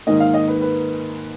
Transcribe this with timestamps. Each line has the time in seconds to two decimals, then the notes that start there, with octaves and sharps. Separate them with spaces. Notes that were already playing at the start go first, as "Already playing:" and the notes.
0.07 G#2 D#3 A#3 D#5
0.20 F5
0.34 D#5
0.48 B4
0.61 B4